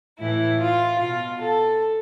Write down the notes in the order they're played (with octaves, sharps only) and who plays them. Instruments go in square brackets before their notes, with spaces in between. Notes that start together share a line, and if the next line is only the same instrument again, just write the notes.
[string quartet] A2 E3 E4
F4
B2 F4
A4